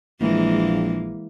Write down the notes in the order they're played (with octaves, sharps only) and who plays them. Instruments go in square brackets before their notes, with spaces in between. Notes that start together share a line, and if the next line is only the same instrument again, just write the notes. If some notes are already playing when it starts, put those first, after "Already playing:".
[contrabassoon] A#1 [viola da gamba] E3 G#3 A#3